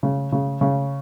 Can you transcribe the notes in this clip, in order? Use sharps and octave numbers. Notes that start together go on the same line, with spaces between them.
C#3
C#3
C#3